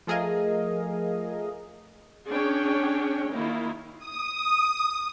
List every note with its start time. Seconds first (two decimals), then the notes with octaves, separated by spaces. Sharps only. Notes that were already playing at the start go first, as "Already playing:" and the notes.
0.07 F3 A3 G#4 A#4 D#5 F5
2.29 C#4 D4 G#4 C#5 G5
3.33 D#3 A#3 E4 F4
3.98 D#6